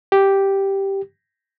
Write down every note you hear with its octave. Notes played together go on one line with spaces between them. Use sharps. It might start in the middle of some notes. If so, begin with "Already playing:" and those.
G4